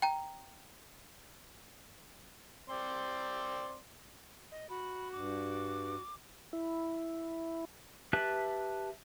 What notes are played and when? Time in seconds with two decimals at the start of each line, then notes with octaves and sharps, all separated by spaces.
0.02 G5 A#5
2.70 C4 D5 C6
4.52 D#5
4.69 F#4 B5
5.12 G2 D6
6.53 E4
8.13 G4 B4 E5 A5 F#6